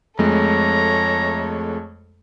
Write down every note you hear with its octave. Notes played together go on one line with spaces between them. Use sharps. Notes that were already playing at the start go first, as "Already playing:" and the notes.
F2 G#3 A3 A4 C#5 A#5